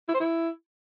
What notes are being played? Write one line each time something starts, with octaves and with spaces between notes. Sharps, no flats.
E4
C5
E4